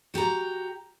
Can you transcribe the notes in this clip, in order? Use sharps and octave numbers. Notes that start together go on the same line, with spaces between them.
F#4 G4 A5 A#5